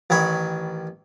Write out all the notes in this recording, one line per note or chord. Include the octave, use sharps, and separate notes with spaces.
A1 D#3 C#5 B5